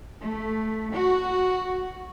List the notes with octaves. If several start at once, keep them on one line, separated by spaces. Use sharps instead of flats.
A3
F#4